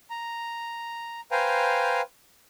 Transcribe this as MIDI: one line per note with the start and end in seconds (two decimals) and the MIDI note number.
0.10 1.21 82
1.31 2.01 71
1.31 2.01 72
1.31 2.01 77
1.31 2.01 79
1.31 2.01 80
1.31 2.01 82